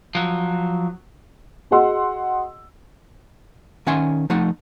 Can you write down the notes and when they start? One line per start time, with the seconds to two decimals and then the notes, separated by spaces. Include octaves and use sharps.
0.15 F3 F#3
1.71 F#4 G#4 D#5 F#5 C6 E6
3.87 D#3 C#4 E5 F#5 G#5 C6
4.30 F3 A3 D#4 F#5